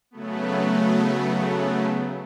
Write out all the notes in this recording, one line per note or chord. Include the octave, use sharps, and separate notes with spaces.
C#3 F#3 A3 B3